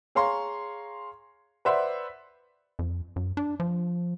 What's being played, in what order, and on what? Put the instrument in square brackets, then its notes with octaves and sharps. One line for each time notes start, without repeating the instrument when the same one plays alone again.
[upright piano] G#4 C#5 F5 A#5 C6 C#6
B4 C5 D5 E5 F#5 C6
[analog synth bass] F2
F#2
D4
F3